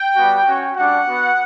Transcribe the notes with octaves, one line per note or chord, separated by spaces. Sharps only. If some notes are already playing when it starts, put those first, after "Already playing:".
Already playing: G5
G3 B3 F#4
C#4 F#4
G3 D4 F#4 F#5
B3 F#4